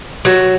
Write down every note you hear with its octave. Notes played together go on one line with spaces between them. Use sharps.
F#3